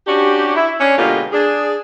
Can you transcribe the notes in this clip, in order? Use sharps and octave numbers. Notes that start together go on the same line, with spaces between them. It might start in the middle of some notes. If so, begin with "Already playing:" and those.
C#4 D4 F#4 G4
E4
C#4 D4
B2 D3 G#3 A#3 F4 G4
D4 G#4